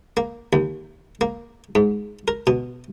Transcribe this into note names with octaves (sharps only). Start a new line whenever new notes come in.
A#3
D#2
A#3
G#2
A#4
B2